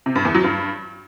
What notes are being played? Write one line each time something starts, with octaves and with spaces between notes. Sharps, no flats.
C3
G2
E2
F#3
G2